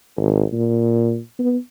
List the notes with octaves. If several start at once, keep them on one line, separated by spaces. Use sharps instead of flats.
G#1
A#2
B3